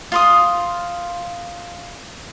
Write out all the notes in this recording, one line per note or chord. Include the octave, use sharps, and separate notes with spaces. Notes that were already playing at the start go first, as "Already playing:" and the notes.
F4 C6 D#6